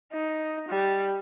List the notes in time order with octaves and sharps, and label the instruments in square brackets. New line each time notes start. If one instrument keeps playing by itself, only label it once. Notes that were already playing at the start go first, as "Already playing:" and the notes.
[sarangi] D#4
G3